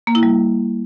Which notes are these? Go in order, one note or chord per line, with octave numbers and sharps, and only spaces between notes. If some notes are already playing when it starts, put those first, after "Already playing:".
A#3
E4
G3